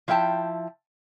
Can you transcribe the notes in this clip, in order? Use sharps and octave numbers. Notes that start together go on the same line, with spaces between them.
F3 E4 E5 G5 A5